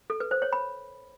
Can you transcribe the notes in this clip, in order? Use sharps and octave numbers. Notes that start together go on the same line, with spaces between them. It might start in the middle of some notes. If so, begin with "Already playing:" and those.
A4
B4
C5
C#5
B5